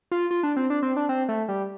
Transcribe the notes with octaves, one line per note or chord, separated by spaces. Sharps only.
F4
F4
D4
C4
D4
C4
D4
C4
A3
G3